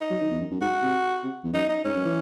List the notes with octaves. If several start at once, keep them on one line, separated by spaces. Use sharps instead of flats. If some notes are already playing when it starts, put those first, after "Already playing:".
D#4
F#3
D#3
E2
F#2
F#2
G#2 F#4
C3
C3
E2
F#2 D#4
D#4
G#2 C#4
F#2
E3